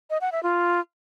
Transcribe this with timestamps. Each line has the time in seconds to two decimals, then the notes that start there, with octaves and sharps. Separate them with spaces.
0.10 D#5
0.21 F#5
0.32 E5
0.43 F4